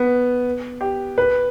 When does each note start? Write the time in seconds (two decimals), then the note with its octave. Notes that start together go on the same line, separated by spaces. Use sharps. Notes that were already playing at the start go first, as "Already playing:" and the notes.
Already playing: B3
0.81 G4
1.18 B4